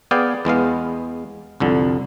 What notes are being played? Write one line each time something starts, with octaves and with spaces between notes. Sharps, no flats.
B3 G#4 D5 F5 G5 G#5
E2 G#3 B3 F5
C2 F2 D3